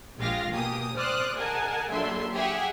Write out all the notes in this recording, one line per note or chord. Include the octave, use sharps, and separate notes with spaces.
A#1 G#3 F4 G4 F5 A#6
B2 A#3 G4 G#5 D#6
C5 D5 D6 D#6 F6 F#6
G#4 A#4 D#5 F#5 G#5 A5
A#1 F#3 D4 A4 E5 C6
G4 G#4 E5 F#5